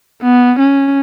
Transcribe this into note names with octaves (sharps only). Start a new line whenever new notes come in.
B3
C#4